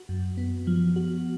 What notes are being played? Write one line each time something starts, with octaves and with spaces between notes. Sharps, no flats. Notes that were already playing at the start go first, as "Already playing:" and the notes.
Already playing: F#4
F#2
B3
F3
F#4